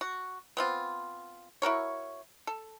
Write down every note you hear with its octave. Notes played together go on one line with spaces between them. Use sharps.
F#4
B3 C4 F4
E4 F#4 A#4 C#5
A4